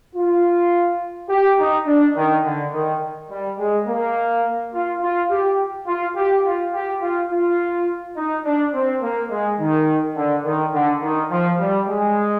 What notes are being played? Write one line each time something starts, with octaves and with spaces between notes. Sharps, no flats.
F4
G4
D#4
D4
D#3
D3
D#3
G3
G#3
A#3
F4
F4
G4
F4
G4
F4
G4
F4
F4
D#4
D4
C4
A#3
G#3
D#3
D3
D#3
D3
D#3
F3
G3
G#3